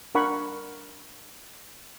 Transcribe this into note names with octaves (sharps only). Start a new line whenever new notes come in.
D4 A#4 F#5 B5 C#6